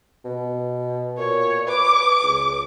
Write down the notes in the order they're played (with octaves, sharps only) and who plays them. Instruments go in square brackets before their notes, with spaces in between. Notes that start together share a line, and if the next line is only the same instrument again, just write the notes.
[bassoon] B2
[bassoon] A#2 [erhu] C#5
[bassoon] B4 [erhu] D6
[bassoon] C#2